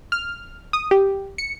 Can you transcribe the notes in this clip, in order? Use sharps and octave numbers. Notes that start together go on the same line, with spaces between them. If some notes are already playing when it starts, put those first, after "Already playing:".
F6
D#6
G4
C#7